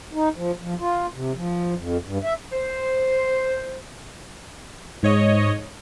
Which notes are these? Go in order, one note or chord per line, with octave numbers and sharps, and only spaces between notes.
D#4
F3
F3
F4
C3
F3
F2
G2
E5
C5
G#2 C#5 D#5